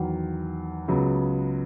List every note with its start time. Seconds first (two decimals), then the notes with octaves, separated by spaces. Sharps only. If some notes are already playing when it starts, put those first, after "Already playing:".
Already playing: E2 D#3 F#3
0.88 C#2 C#3 F#3 B3